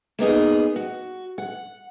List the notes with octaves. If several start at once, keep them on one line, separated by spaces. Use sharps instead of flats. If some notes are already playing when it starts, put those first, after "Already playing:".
A#3 B3 D#4 G#4
F#4
F#5